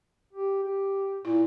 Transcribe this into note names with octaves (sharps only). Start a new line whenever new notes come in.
G4
G4
A#2 E4